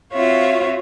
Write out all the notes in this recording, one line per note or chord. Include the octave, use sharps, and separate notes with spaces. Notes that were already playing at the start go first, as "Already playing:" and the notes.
C4 F4 F#4 C#5 E5 F5